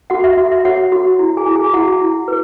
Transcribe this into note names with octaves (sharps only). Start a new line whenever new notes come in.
F#4 F#5
E5
F#4
E5
F#4 C#5 F#5
F#4
E4
G#4 G#5
E4
G#4 G#5
E4 F#4 F#5
E4
B4